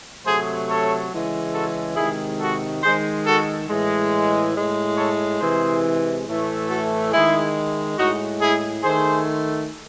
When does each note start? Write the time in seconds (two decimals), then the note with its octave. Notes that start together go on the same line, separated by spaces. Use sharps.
0.25 C3 F#3 A3 G#4 C5
0.69 A4 C#5
1.12 C#3 E3 G#3
1.54 F#4 A4
1.96 C3 D#3 G#3 E4 G#4
2.40 F#4 A4
2.83 D#3 G#3 G#4 C5
3.26 F#4 A4
3.69 A2 E3 G#3
4.55 A2 G#3
4.97 A4 C#5
5.40 C3 E3 G#3 G#4 C5
6.27 A2 E3 A3
6.69 F#4 A4
7.12 D#3 G#3 E4 G#4
7.98 A2 G#3 D#4 F#4
8.41 E4 G#4
8.84 D#3 A3 G#4 C5